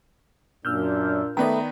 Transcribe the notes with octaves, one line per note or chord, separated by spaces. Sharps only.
F#2 A#2 D4 E6 F6 G6
D#3 A3 B3 B4 D5 A#5